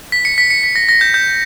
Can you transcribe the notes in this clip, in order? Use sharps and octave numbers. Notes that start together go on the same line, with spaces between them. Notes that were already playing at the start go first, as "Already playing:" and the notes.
B6
C#7
B6
C#7
B6
A#6
A#6
G6
G6